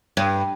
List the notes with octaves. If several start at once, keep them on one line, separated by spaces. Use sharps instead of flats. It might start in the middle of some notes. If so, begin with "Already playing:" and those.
G2